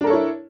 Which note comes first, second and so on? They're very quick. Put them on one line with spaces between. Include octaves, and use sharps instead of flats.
D4 A#4 A4 C#5 E4